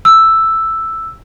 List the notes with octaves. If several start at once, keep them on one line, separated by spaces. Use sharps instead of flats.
E6